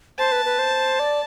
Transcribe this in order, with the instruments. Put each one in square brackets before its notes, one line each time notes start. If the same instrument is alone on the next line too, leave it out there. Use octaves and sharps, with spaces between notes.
[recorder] C5 [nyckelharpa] A5
[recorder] B4
B4
C5
D5